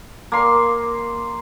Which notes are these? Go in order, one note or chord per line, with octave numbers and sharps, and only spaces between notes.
A#3 C6